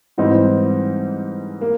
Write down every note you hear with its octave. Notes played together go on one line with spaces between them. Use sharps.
G#2 E3 G3 C4 D#4
A#3